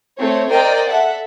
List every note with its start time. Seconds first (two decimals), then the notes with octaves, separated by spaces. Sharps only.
0.18 A3 C4 C#5
0.52 A#4 C5 D5 D#5 G5
0.88 A4 E5 F#5